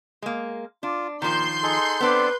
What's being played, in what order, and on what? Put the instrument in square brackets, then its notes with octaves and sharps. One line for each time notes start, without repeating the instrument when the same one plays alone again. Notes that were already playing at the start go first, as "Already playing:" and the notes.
[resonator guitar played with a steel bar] G#3 A#3
[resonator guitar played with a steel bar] D4 [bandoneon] F4
[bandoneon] A#2 [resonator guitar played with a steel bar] D#3 F3 [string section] C6 G6
[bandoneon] D#4 G#4 A4
[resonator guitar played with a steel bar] B3 D4 [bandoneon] C4 A4 C5 [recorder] B4